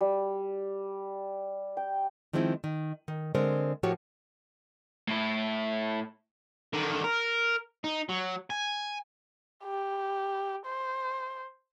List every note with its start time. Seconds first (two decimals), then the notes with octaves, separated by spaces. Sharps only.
0.01 G3
1.77 G5
2.33 D#3 F3 G#3 C4 E4
2.64 D#3
3.08 D#3
3.35 D3 G#3 C4 A#4 C5
3.83 A2 F3 F#4 G4 A#4 C#5
5.08 A2 E4
6.73 D3 D#3
7.04 A#4
7.84 D#4
8.09 F#3
8.50 G#5
9.64 G4
10.65 C5